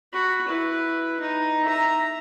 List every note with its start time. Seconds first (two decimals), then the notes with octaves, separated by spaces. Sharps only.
0.13 F#4 B5
0.48 E4 B4
1.20 D#4
1.64 E5 A#5